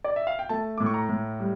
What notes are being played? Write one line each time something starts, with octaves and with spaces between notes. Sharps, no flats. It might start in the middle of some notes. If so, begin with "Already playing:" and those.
D5
E5
F5
G5
A3 A5
A2 D6
C#6
A#5
A2
G3